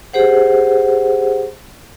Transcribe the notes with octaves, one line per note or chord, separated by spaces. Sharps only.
G4 G#4 C5 F#5